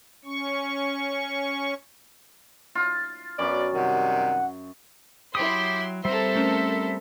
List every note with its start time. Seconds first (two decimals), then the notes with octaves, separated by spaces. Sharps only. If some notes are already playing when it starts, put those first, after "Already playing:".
0.25 C#4 C#6
2.75 F4
3.39 F#2 B3 D5
3.75 C3 D#3 G3 F#5
5.35 F#3 E4 G4 G5 C6 D#6
6.05 G3 C4 A4 A#4 C5 E5
6.36 A3 C#4